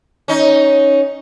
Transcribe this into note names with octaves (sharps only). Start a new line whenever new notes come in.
C#4 D#4